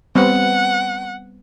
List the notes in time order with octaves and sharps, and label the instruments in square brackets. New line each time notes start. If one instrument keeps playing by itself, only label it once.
[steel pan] G3 B3 C4 [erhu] F#5